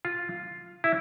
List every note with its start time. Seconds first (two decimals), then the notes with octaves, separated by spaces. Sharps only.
0.05 F4
0.84 E4